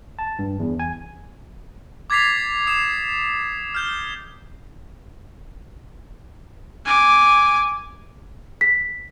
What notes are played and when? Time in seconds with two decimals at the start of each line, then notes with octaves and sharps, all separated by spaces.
0.19 A5
0.39 G2
0.59 E2
0.79 G#5
2.10 D6 G#6 A6 B6 C7 F7
2.67 D#6 C7 E7
3.74 F6 G6 G7
6.86 G#5 D6
8.61 B6